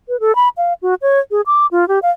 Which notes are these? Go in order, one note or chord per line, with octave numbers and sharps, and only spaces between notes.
B4
A4
B5
F5
F#4
C#5
G#4
D6
F4
G4
F5